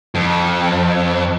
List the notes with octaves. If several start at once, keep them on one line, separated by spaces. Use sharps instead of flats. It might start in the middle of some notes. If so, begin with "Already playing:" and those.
F2